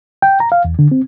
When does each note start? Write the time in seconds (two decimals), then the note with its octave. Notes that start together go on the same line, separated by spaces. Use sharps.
0.22 G5
0.40 A#5
0.52 F5
0.65 E2
0.79 D3
0.92 C4